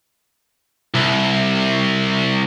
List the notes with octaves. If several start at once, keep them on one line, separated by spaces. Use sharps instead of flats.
C2